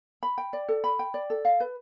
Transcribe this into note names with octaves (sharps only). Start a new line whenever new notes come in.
B5
G5
D5
A4
B5
G5
D5
A4
F5
B4